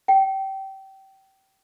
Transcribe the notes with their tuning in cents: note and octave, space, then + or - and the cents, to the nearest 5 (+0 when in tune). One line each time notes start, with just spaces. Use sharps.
G5 -25